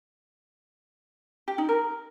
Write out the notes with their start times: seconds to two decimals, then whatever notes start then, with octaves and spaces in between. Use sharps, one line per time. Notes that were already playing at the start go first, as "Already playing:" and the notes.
1.48 G4
1.58 D#4
1.69 A#4